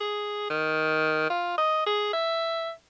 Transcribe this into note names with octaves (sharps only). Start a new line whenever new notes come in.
G#4
D#3
F4
D#5
G#4
E5